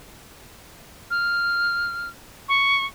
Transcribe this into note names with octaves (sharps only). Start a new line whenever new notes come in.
F6
C#6